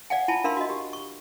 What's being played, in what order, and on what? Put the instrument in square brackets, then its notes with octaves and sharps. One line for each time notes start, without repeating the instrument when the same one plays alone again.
[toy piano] D5 F5 F#5 G#5
E4 F4 G#5 A5 B5
D4 A#4 F5 B5 C6
F#4 D#5
G4
C#6